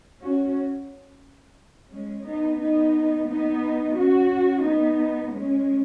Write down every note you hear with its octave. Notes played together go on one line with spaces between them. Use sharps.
C#4 F#4
G#3 C#4
B3 D#4
B3 D#4
B3 D#4
C#4 F#4
B3 D#4
G#3 C#4